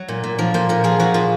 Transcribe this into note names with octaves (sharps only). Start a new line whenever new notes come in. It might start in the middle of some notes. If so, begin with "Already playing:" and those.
Already playing: F#3 F#4
A#2
A#2
F3 A#4
A#2 C5
A#2 A#4
F3 G#4
F3 F#4
A#2 F4